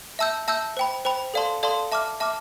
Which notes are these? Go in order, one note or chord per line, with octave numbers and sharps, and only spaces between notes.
E5 A5 E6 G6
E5 A5 E6 G6
C5 G5 B5
C5 G5 B5
A4 D5 F5 A5 C6
A4 D5 F5 A5 C6
E5 A5 D6 F6
E5 A5 D6 F6